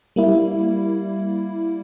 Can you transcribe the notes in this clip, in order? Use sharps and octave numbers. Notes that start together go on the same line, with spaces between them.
G3 A#3 E4